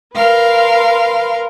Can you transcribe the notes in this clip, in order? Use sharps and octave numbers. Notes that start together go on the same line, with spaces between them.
A#4 B4 F5 C6